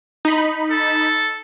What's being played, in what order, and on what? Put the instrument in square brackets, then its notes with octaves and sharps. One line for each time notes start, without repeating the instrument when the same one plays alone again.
[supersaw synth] D#4 B5
[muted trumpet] A4